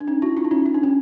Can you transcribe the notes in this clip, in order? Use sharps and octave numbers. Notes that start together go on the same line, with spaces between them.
D4
C#4 D#4
E4 F#4
D#4 F4
E4
C#4 D#4
D#4
D4
C#4